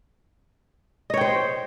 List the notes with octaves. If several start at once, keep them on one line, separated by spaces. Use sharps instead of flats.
C5 C#5 D#5 G5